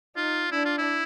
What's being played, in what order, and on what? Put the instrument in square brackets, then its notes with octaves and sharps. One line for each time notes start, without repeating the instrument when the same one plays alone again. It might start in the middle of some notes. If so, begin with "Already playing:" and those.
[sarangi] D#4 [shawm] F4
[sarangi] D4 [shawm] E4
[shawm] F4
E4